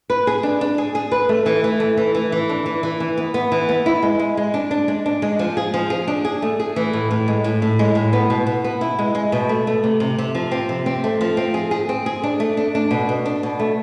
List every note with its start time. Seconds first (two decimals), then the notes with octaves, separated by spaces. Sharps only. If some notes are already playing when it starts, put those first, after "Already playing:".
0.10 B4
0.27 G#4
0.43 D4
0.61 D4
0.78 G#4
0.95 G#4
1.12 B4
1.29 A3
1.46 E3
1.64 E3
1.80 A3
1.97 E3
2.15 E3
2.32 E3
2.49 D4
2.66 E3
2.83 E3
3.00 E3
3.18 B3
3.34 B3
3.52 E3
3.69 B3
3.86 E4
4.03 G#3
4.19 G#3
4.37 G#3
4.54 D4
4.71 D4
4.88 G#3
5.06 D4
5.22 G#3
5.39 F3
5.57 G#4
5.74 F3
5.90 G#4
6.07 D4
6.25 G#4
6.42 A3
6.60 G#4
6.76 E3
6.93 A2
7.11 A2
7.28 G#3
7.44 A2
7.62 A2
7.79 G#3
7.95 A2
8.13 B3
8.30 B2
8.47 B2
8.64 B3
8.81 E4
8.99 G#3
9.15 G#3
9.32 B2
9.49 A3
9.67 A3
9.84 C3
10.00 C3
10.18 C3
10.35 F3
10.51 C4
10.69 C3
10.86 C4
11.04 A3
11.21 F3
11.37 C4
11.54 G#4
11.71 G#4
11.89 C4
12.06 G#4
12.24 D4
12.40 A3
12.57 D4
12.75 D4
12.91 B2
13.09 B2
13.26 D4
13.43 B2
13.60 A3